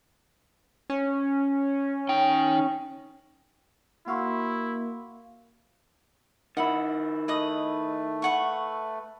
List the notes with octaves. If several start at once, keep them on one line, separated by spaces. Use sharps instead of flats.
C#4
D#4 G5
A#3 E4 F#4 F5 C6 C#6 E6
D#3 E4 F#5 B5
A3 B4 D#5 D#6
B4 F#5 C#6